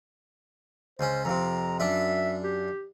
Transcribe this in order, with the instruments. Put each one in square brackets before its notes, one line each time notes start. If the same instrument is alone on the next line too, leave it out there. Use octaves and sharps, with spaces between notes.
[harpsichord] C#2 C#4 [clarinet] C5
[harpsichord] F2 C3 [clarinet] A#5
[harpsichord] F#2 D4 [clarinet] E5
[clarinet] G4